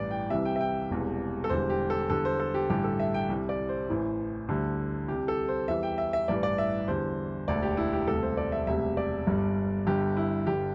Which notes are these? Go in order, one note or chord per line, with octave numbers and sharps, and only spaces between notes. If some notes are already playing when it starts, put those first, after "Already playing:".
Already playing: A1 G2 E3 G3 D5
G5
C2 C3 E3 G3 E5
G5
E5
G5
E1 E2 C3 G3
A4
E1 E2 D3 G3 C5
G4
A4
E2 D3 G3 A4
C5
A4
G4
A1 G2 D3 G3 G4
A4
E5
G5
C2 C3 G3
D5
C5
A1 A2 E3
D2 D3 G3
C2 C3 G3 G4
A4
C5
E2 E3 G3 E5
G5
E5
E5
A1 G2 E3 G3 D5
D5
E5
E2 D3 G3 C5
E1 D2 D3 D5
G4
E4
G4
E1 D2 C3 G3 A4
C5
D5
E5
E1 D2 C3 G3 E5
D5
G1 G2 G3
G1 G2 D3 G3 G4
E4
G1 G2 D3 G3 G4